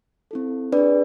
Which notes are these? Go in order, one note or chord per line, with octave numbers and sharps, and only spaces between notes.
C4 E4 A4
D4 G#4 B4 D5